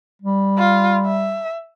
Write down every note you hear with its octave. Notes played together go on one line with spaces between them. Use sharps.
G3
F4
E5